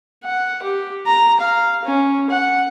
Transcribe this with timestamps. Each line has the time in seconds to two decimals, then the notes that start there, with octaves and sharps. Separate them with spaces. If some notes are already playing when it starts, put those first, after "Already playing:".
0.25 F#5
0.63 G4
1.07 A#5
1.41 F5
1.85 C#4
2.30 F#5